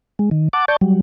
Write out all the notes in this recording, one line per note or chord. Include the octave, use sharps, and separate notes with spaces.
G#3
D#3
F#5 A5 D6
D5 A5 C#6 G6
F#3 G3